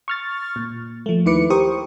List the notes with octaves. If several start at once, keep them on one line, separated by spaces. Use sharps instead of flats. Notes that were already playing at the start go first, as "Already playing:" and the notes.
C#6 F6 A6
A#2
F3 A3
D#2 D#3 E4 B4 D6 C#7
G4 A#4 C5 C#6 D#6